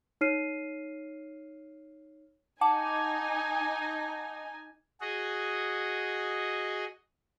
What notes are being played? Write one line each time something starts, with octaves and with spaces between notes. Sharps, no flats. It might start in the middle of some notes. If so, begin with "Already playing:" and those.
D#4 C#5 F6 C7 D#7
D#4 F#5 G#5 A5 D6
F#4 G#4 D#5